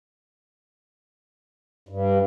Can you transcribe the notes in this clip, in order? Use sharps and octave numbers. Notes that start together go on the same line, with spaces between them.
G2